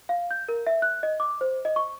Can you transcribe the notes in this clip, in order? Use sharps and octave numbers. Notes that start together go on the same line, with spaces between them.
F5
G6
A#4
E5
F#6
D#5
D6
C5
D#5
C#6